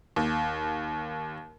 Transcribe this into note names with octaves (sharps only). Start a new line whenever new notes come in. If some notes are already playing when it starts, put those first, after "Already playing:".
D#2